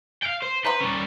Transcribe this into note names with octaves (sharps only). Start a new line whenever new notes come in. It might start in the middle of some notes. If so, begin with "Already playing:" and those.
F5 G5
C5
B4 C5 A#5 C6
G3 C#4